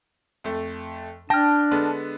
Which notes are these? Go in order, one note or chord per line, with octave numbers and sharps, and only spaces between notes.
F2 A3
D4 G5 A5 F6 A#6
D3 G#3 B3